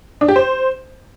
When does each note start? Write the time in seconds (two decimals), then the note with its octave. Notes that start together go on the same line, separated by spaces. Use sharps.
0.21 D4
0.28 G4
0.36 C5